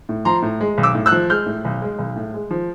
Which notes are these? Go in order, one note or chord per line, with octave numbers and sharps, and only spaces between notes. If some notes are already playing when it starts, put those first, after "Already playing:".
A2
F3 A#5 C6
A2
G#3
B1
D6 E6
A2
E6 F#6
F3
G#3 F6 G6
A2
B1
G#3
B1
A2
G#3
F3